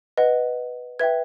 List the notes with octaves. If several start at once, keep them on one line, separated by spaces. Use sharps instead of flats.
B4 D#5 F#5
B4 E5 G5 G#6